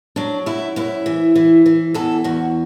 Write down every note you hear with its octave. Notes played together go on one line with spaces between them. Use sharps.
F#3 D4
F#2 E4
F#2 E4
E3
E3
E3
E2 A4
E2 F#4